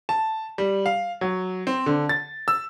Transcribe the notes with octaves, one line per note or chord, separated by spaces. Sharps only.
A5
G3
F5
F#3
C4
D3
A6
E6